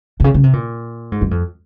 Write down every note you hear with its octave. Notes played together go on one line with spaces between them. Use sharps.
C3
C#3
C#3
C3
A#2
G#2
F#2
F2